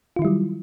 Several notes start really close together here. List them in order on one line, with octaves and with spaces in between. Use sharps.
F4 D#3 E4 G3 F#3